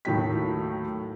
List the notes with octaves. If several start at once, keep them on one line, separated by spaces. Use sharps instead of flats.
D#2 A2 D#3 F#3 G5 B6